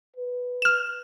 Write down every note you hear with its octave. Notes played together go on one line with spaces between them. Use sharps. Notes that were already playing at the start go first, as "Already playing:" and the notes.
B4
F6 E7